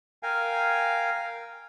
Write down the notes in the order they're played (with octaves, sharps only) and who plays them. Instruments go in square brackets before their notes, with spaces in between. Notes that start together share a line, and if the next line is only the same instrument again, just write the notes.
[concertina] A#4 F5 G5 G#5